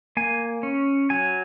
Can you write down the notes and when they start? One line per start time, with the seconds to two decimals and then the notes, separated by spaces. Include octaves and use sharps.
0.17 A#3 G#5
0.63 C#4
1.10 F#3 G#5